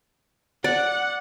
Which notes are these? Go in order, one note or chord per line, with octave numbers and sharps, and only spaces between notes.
D5 F#5